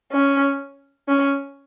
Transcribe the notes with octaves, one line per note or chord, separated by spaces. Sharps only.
C#4
C#4